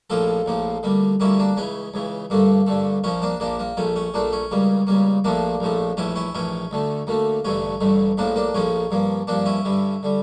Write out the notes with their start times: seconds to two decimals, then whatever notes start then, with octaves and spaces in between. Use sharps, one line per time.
0.10 A#1 A2 F3 A#3 F4 A4
0.46 A#1 A2 F3 A#3
0.83 D2 D3 G3 A#3
1.20 D2 D3 G3 A#3 C#4 E4
1.39 A#3 D4
1.57 C#2 C#3 E3 C#4
1.94 C#2 C#3 E3
2.30 G2 D3 A3 A#3
2.67 G2 D3 A3
3.04 A#1 A#2 F3 C#4
3.22 A#3 D4
3.40 A#1 A#2 F3 A#3 D4
3.60 A#3
3.77 A#1 A#2 A3 C#4
3.96 C#4
4.14 A#1 A#2 A3 A#3 D4
4.33 C#4
4.51 C#2 C#3 G3 A#3
4.87 C#2 C#3 G3 A#3
5.24 A#1 A2 F3 A3 A#3 D4
5.60 A#1 A2 F3 A3
5.97 A#1 A2 E3 C#4 E4
6.15 C#4 E4
6.35 A#1 A2 E3 C#4
6.71 D2 D3 A3
7.07 D2 D3 A3 A#3
7.45 A1 G2 D3 A3 C#4
7.81 A1 G2 D3 A3
8.18 A#1 A2 F3 A#3 D4
8.36 A#3 D4
8.55 A#1 A2 F3 A#3 C#4
8.91 G2 F3 A#3
9.27 G2 F3 A#3 D4
9.46 C#4 E4
9.65 G2 D3 G3
10.03 D3 G3